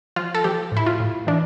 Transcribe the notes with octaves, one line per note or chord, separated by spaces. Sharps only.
F3 F4
A4
F3 G4
A2 E4
F4
A2
E3 D4